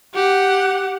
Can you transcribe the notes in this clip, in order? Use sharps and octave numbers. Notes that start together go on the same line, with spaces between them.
G4 F#5